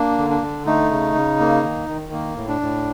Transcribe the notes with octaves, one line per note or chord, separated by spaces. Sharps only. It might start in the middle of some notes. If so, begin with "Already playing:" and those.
Already playing: A#3 D4
D3
D4
D3
A3 D#4
C#3
C#3
A#3
D#3
D#3
A#3
A2
D4
A2